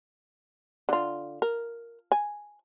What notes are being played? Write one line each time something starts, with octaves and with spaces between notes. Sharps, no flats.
D3 F4
A#4
G#5